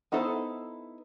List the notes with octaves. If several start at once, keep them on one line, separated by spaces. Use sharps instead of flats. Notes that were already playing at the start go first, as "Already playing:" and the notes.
B3 D#4 E4 A4 C5